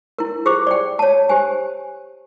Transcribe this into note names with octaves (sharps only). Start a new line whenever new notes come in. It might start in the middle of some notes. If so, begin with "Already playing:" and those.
E4 A#4
F4 G4 G#4 C5 C#6 D6
D5 G5
C#5 A5
G4 C5 G#5